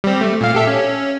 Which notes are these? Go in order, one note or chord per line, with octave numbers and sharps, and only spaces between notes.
G3 C4
A3
A#2 F5
G4 A4 E5
C#4